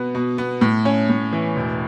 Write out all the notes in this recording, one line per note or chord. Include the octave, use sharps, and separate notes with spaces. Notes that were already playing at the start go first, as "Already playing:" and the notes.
Already playing: B2 B3
B2
B3
A2
C#4
A2
E3
E1